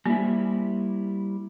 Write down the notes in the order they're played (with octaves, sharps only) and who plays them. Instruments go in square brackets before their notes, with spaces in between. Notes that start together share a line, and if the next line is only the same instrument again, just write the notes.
[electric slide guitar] G3 E4 [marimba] A#3